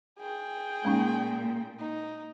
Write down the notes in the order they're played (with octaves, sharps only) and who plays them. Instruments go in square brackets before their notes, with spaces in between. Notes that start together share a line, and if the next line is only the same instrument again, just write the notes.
[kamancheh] G#4 G5
[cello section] A#2 [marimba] G#3 C#4 D#4
[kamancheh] D#4